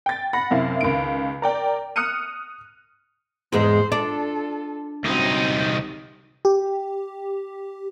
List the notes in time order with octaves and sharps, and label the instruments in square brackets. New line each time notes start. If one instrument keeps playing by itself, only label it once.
[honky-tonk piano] G5 A6
F#5 B5 A#6
F#2 C3 E4 F5
C#2 D#3 D7
A#4 D5 G5
D#6 F6 F#6 C#7 D#7
[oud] E2 G#2 G#3 [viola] C5
[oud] D4 [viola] F4 A4
[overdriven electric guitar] C2 D#4 [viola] F#3 C4
[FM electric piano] G4